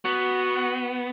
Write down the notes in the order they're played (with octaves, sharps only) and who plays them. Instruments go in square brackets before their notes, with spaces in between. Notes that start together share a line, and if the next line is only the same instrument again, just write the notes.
[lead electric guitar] B3 [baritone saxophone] F#4